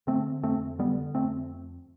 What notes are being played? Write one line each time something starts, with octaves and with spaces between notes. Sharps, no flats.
D3 A3 C4
F2 A3 C4
D3 G3 B3
F2 A3 C4